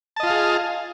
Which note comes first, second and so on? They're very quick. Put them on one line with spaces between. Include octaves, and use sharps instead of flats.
A5 D#5 F4 F5 G#4